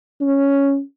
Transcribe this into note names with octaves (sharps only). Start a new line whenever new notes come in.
C#4